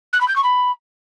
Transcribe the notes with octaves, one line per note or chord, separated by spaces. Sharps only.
F#6
B5
G6
C#6
B5